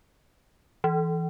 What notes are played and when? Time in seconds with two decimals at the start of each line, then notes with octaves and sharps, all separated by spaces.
0.84 E3